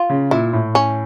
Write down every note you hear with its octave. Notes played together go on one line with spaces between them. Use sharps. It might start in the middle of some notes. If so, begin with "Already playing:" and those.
Already playing: F4
C#3
A#2 E4
A2
C#4